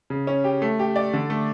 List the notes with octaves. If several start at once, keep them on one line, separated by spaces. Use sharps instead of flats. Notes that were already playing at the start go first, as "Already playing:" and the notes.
C#3
C#4
G4
A3
G4
D5
D3
A3